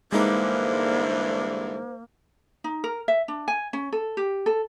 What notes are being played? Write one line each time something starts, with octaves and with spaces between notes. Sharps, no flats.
G2 D3 E3 G#3 A#3 D#4 C5
D#4
A#4
E5
D4
G#5
C#4
A4
G4
A4